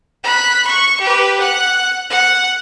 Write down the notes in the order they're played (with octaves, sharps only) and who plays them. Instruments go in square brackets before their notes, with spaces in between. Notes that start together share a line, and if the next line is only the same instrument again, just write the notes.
[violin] B5 F#6
C#6
G4 B4
F#5 F#6
F#5